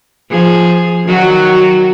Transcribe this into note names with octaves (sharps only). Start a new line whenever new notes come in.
F3 G#4
D#3 F#3 F#4